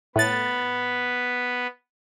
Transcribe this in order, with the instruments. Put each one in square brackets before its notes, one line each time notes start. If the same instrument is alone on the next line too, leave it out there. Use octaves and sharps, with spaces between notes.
[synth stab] A2 A6 [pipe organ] B3 B4